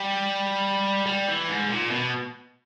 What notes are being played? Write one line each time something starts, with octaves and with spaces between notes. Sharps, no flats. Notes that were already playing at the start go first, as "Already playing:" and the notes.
Already playing: G3
G3
E3
G#2
A#2
B2